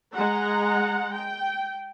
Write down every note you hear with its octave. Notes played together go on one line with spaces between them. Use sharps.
G#3 F#5 A#5
G5